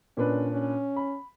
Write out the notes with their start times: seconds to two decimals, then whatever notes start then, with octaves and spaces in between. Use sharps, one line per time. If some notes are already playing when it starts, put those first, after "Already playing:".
0.17 A#2 C#4 D4 B4
0.51 C#4
0.96 B5